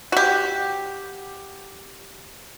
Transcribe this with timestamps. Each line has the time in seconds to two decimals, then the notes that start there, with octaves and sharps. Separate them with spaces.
0.12 F#4 G4